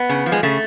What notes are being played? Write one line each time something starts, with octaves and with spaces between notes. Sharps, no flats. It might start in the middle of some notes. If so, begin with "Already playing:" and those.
Already playing: B3
C#3
F3
G#3
C#3 A3